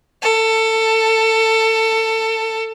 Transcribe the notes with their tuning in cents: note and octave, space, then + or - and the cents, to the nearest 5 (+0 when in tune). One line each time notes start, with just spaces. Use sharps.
A4 +20